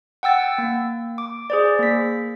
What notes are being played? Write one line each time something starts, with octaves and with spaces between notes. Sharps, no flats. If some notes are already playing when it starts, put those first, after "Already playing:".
F#5 G5 E6 A6
A#3
D6
G#4 C5 D5
A#3 B6